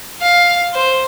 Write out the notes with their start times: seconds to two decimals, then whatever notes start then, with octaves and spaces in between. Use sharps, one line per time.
0.21 F5
0.74 C5